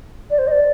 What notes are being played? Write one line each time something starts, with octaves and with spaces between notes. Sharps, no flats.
D5
C5
D#5
D5